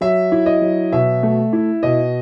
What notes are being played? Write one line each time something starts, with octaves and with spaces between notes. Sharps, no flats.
F#3 E5
E4
D#5
F#3
B2 E5
A3
E4
B2 D#5